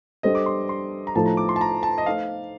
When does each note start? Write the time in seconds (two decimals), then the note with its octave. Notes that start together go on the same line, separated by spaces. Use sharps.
0.23 G3 D4 A4 C5 D#5
0.35 D6
0.46 C6
0.69 C6
1.07 A#5
1.15 A2 F3 A3 D#4 A4 A5
1.26 A#5
1.37 D6
1.49 C6
1.56 A5
1.61 A#5
1.83 A5
1.98 D#5
2.06 A3 D#4 A4 C5 F5